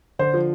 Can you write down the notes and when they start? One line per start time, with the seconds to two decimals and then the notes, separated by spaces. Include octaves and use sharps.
0.19 D3 C5
0.34 F3